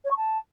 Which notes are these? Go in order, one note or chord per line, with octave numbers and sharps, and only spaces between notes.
C#5
C#6
A5